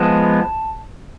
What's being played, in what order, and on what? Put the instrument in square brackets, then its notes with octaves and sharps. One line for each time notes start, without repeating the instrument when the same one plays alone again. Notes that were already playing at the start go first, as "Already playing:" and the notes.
Already playing: [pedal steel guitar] F3 G#3 B3 A5